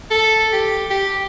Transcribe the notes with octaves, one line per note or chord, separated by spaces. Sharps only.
A4
G4
G4